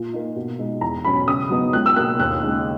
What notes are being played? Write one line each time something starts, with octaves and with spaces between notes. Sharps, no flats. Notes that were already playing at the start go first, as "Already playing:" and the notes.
Already playing: A#2
A#3 D#4
B2
G#3 D#4
E2 A#5
B2 F#3 C#4 B5
C#3 D#6
F#3 B3 D#4
C#2 F#6
E6
B2 A#3 F#6
D#2 F#6
C#3 G#3 D#4